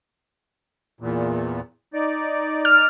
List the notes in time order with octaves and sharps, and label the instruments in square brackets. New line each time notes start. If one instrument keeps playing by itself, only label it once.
[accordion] E2 A#2
D#4 D5
[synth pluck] F6